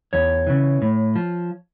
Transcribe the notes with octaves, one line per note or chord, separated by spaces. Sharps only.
E2 C#5
C#3 E3
A2
F3